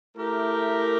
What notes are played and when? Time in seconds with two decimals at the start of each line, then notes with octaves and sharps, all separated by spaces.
0.17 A3 E4 G4 A#4